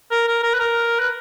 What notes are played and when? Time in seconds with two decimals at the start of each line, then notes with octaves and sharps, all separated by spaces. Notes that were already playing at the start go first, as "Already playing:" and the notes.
0.11 A#4
0.28 A#4
0.43 A#4
0.54 B4
0.60 A#4
0.99 B4